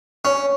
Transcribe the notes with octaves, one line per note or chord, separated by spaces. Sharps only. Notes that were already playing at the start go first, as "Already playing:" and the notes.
C#4